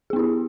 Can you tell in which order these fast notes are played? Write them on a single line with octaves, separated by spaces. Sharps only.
G#4 B3 E4 G4